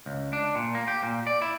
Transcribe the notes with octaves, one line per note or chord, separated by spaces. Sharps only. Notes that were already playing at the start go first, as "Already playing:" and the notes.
C#2
D4
A#2
A#3
G4
A#2
D5
E4